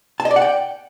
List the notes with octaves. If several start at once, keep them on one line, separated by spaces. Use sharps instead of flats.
A5
D#5
D5
F#5
G5